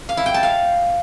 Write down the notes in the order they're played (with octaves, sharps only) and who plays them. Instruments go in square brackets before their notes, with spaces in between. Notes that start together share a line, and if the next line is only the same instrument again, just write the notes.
[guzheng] F5
E4
G5
A5
F5